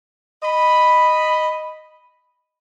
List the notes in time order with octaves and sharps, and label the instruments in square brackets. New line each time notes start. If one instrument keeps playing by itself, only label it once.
[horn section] D#5 B5